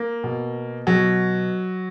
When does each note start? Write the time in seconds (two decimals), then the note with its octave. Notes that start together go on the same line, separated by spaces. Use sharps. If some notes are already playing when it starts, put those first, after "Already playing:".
Already playing: A#3
0.24 B2
0.87 B2 F#3